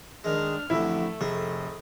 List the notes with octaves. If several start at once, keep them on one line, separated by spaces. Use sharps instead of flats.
D#3 G#3 D4 F6
A1 F2 D3 A3 E4
F1 G#4